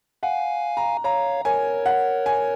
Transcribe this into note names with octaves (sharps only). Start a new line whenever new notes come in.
F5 F#5 G#5
A#5
C#5 F5 A#5
A#4 C#5 G#5
F#5
G#5